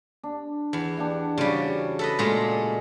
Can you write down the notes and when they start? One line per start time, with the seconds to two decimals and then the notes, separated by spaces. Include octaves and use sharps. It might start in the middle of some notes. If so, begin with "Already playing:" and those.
0.23 D4
0.73 E2
0.97 D4 F#5 G5
1.38 C#3 G3 F#4 C5 D5
1.99 A4 B4 D#5
2.19 A#2 G#3 A3